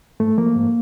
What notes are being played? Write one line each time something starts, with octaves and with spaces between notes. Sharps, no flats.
G#2 A3
F3 A#3
G#2